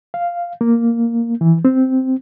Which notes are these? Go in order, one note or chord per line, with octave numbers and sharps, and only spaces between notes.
F5
A#3
E3
C4